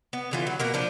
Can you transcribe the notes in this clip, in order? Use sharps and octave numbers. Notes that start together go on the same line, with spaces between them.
B3
D3 E3 F4
F#3
B2 A#3 A#4
F3 D4